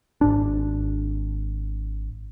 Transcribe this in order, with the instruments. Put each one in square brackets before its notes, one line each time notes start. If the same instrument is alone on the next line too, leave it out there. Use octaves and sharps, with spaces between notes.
[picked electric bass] G#1 G#2 D4